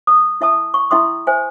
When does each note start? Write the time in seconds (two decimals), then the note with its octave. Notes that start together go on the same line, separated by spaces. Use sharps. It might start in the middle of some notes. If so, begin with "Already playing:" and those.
0.07 D#6
0.41 E4 E5 A5 D#6
0.74 C#6
0.91 E4 E5 G5 C6 D#6
1.27 C5 E5 G#5